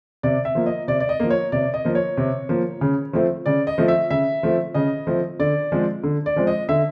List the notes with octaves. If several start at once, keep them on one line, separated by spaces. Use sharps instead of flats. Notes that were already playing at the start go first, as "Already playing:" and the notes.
C3 D5
E5
F3 A#3
D#5
C3 D5
D5
D#5
F3 A#3
C#5
C3 D5
D#5
F3 A#3
C#5
C3
F3 A#3
C#3
F3 A3 C4
C#3 D5
D#5
F3 A3 C4
E5
C#3 E5
F3 A3 C4
C#3 D#5
F3 A3 C4
D3 D5
F3 G#3 C4
D3
D5
F3 G#3 C4
D#5
D3 E5